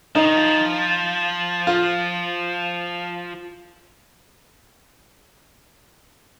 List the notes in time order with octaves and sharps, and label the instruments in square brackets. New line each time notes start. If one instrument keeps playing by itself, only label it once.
[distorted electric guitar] F3 [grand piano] D#4
[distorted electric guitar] D#3
F3
[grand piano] F4